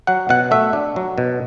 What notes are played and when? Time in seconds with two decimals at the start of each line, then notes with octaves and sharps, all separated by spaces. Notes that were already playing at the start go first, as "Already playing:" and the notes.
0.07 F#3 F#5
0.29 B2 F#5
0.51 A3 E5
0.73 D4
0.96 F#3
1.18 B2